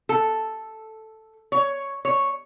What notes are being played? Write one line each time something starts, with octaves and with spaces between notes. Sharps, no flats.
A4
C#5
C#5